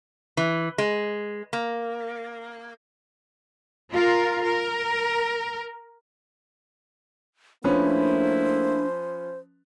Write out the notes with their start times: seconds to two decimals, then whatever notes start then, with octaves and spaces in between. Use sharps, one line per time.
0.37 E3
0.78 G#3
1.53 A#3
3.94 F4 A#4
4.46 A#4
7.64 F3 A3 A#3 C#4 D4 E4 B4 C5